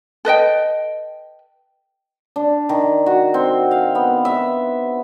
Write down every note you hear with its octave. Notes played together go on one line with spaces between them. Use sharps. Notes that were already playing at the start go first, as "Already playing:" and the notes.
A4 B4 D#5 G5
D4
D#3
F#4
C4
F5
B3
E5